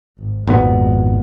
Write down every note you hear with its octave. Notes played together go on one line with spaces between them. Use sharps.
G#1
G#1 F2 A#2 G#3 B3